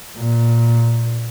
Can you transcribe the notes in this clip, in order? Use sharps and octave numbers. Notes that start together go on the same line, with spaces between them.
A#2